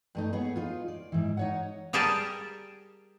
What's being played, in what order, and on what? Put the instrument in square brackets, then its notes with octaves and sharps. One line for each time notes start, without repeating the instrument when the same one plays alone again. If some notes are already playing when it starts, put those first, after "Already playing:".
[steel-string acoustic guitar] G2 A3 D#4
B3 G#4 C#5
D#4 F4
D5
G#2 E3
D#4 C#5 F#5
[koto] G3 G4 G#4 A#4 D5 A5